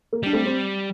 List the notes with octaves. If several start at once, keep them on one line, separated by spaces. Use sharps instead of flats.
A#3
G3 D4
A3 C4
C4